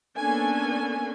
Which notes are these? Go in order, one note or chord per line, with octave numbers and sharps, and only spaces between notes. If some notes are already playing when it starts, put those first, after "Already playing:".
A#3 B3 C#4 D4 A4 G#5